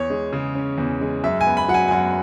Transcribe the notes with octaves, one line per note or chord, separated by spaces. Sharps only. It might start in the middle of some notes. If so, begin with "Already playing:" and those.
Already playing: E2 C#5
G#3
C#3
C#4
E2
G#3
F#2 E5
G#5
B3
B5
F#3 F#5
G#5
G#5
F#2 F#5